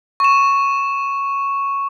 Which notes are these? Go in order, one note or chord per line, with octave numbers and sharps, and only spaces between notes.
C#6 E7